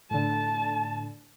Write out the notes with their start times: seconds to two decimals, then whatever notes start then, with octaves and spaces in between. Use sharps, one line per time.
0.11 A2 D3 A5